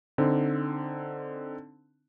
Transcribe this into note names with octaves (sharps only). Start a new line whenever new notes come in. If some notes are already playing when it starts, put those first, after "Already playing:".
D3 C4 D#4